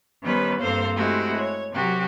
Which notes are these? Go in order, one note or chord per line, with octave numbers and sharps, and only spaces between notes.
D#3 G3 B3 C#4 B4 C5
G2 A#3 C4 A4 C5 F5
G#3 A3 C4 E4 F#4 G4
C#5
C3 F#3 F#4 G4 A#4